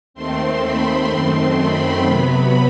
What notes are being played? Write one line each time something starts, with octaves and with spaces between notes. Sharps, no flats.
D#2 D#3 A3 C4 C6
B5
F#2 D#3 A3 C4 C6
B5
C3 F#3 B3 B5